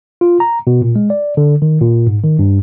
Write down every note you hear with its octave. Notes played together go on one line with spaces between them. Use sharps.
F4
A#5
B2
A#2
G#3
D5
D3
D#3
A#2
G#2
D#3
G2